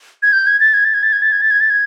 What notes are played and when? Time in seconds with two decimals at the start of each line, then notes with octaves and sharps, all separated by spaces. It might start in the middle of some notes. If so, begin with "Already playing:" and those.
0.23 G#6
0.33 G6
0.47 G#6
0.60 A6
0.74 G#6
0.85 A6
0.94 G#6
1.03 A6
1.13 G#6
1.22 A6
1.32 G#6
1.41 A6
1.51 G#6
1.61 A6
1.70 G#6